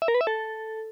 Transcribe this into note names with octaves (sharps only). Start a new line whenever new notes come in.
E5
A#4
B4
E5
A4